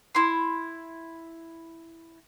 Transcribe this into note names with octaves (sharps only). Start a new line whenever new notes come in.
E4 C6